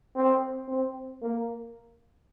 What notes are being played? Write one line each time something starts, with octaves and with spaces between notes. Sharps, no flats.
C4
C4
A#3